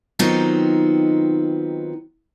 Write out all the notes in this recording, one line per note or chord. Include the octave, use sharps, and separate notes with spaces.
D#3 F#3 B3 C4 D#4 F4